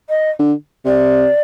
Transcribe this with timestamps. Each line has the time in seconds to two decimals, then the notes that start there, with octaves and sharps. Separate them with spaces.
0.09 D#5
0.39 D3
0.85 C3 D5